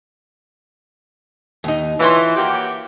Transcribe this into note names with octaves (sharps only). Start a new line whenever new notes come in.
D#2 D#4
E3 F4 C#5 C6
A#3 F#4 G4